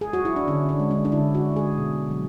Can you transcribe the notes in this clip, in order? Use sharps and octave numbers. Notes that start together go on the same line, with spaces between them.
G#4
F#4
E4
D4
D3 C#4
D4
G#3
D4
D4
D3 E4
F#4
G#3
G#4
B2
F#3